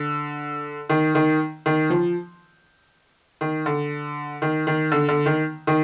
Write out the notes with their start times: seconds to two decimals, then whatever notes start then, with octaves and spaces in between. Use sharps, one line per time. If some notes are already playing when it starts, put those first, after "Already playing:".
Already playing: D3
0.90 D#3
1.15 D#3
1.66 D#3
1.90 F3
3.41 D#3
3.66 D3
4.42 D#3
4.67 D#3
4.92 D3
5.08 D3
5.26 D#3
5.67 D#3